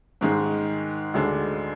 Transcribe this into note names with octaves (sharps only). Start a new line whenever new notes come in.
G#2 D#3 G#3
D2 D3 G#3 D4